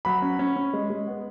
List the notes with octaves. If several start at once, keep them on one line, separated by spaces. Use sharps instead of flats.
F#3 B5
C#4
C#4
C#4
G#3
G#3
B3